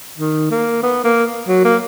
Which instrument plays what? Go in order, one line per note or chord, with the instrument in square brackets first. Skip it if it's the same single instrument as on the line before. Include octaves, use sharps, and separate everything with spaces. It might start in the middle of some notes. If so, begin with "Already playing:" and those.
[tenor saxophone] D#3
A#3
B3
A#3
F#3
A#3